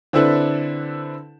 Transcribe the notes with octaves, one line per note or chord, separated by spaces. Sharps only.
D3 C4 D4 E4 A4 B4